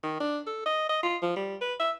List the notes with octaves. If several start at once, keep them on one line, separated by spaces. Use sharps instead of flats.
D#3
D4
A4
D#5
D#5
F4
F3
G3
B4
E5